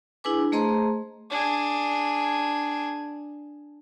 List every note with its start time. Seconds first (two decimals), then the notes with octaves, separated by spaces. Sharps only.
0.24 D4 E4 G#4 B4 G#5 D6
0.52 A3 G#4 C5 D#5 A#5 C6
1.29 D4 G#4